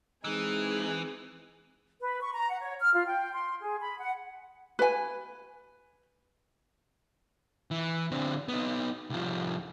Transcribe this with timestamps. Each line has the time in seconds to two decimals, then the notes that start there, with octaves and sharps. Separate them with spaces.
0.24 E3 G#3 C4 D#4 G#4
2.01 B4
2.21 C#6
2.33 A#5
2.49 F#5
2.62 C#5
2.80 F6
2.94 F4
3.06 G5
3.33 C6
3.62 G#4
3.81 B5
3.99 F#5
4.79 B4 G#5
7.71 E3
8.11 D3 C4
8.48 B3 D#4
9.10 C2 F3